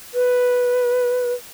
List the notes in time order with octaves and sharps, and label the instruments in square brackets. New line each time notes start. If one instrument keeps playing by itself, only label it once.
[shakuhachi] B4